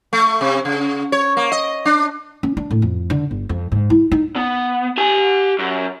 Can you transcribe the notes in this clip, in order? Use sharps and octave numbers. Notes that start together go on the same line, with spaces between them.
A3
C3
C#3
C#5
A#3
D#5
D4
C#4
D4
A2
F2
D3
G1
F2
G#2
E4
D#4
B3
G4 G#5
F#2